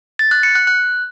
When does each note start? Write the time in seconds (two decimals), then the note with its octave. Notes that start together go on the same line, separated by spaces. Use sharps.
0.19 A6
0.31 F#6
0.43 C#7
0.55 F#6
0.67 F#6